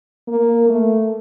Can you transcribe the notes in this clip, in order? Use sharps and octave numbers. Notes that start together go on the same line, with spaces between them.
A#3
A3